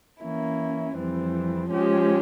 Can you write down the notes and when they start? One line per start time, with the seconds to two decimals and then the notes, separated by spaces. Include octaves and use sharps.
0.22 E3 A#3 C#4 E4
0.95 F2 E3 G3 C4
1.70 F3 G#3 C#4 G4